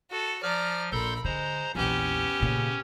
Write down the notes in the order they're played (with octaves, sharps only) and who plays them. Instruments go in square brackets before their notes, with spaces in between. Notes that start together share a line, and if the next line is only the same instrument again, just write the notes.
[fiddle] F#4 A4
[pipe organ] F3 F6 [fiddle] D5 A#5
[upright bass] A#1 [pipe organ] A4 C6 G6 [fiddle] A#4 B5
[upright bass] D3 [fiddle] G#3 [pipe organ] C5 A#5
[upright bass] A#1 E2 [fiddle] B3 G4 [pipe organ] C#4
[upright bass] A#2 C#3